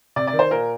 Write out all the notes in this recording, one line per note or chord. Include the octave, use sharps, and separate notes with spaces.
C3 D5
D5
D#3
C5
A#2 A#4